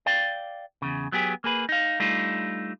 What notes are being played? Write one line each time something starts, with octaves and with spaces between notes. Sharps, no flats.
D5 F5 G5
E2 C#3
F#3 B3 G4 G#4
A#3 G#4 B4
D#4 F5
G3 A3 D4 D#4 F4